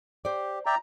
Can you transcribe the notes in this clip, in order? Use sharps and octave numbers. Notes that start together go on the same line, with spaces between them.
G4 C5 D5
D5 E5 G5 A#5